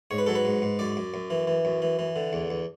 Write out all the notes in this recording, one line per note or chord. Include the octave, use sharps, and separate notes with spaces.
G#2 C#5
B4
F#3 A4
B4
G#2
G#2
F#2 D5
F#2
F#2
E3
E3
F#2
E3
E3
D3
E2
E2